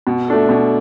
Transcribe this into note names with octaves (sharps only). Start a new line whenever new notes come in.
B2
A3 D4 A4
B2